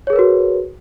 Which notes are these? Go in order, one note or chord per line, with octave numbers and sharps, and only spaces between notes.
F#4 G#4 A#4 B4 C#5